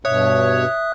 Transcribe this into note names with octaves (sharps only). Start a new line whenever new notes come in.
G2 B2 C#5 E5 D#6 F#6